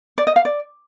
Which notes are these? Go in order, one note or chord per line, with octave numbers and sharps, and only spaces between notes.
D5
D#5
F5
D5